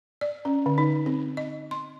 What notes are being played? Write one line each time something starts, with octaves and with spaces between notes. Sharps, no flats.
D5
C#4
D3
D#4
C4
D#5
C6